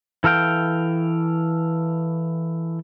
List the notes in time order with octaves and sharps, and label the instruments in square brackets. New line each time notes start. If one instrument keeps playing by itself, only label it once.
[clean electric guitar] E3 A4 F5 G5